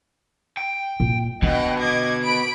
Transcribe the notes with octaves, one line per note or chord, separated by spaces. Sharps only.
G5
A#2
B2 D3 D#5 F#5 G5
D#5 D6 G#6
B5 D7